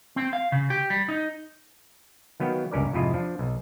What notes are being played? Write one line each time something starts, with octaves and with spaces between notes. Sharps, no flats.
C4
F5
C#3
G4
G3
D#4
D#3 F#3 B3 F5 G5
C#2 G2 C#4 A#4 D5
F2 G#2 C3 E4 F4 D#5
F3 D4
B1